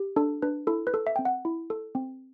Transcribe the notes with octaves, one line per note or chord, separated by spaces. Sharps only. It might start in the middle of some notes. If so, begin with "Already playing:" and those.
Already playing: G4
D4 A4
D4 B4
E4 A4
B4
A4
E5
C4 G5
F#5
E4
A4
C4